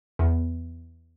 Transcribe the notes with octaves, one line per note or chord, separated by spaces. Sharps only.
E2